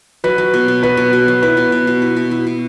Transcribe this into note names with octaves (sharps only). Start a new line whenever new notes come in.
F#3 B4
F#3
B2
B2
F#3 B4
B2
B2
F#3
E4 B4
B2
B2
B2
E4
B2
E4
B2